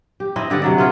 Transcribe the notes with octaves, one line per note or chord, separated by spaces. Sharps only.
G4
C4 E4 B4 D#5
D3 G4 D5 F#5
C3 F#3 D5
B3 E4 F4 G#4